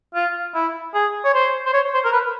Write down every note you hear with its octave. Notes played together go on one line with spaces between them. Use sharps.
F4
E4
G#4
C#5
C5
C5
C#5
C5
A#4
B4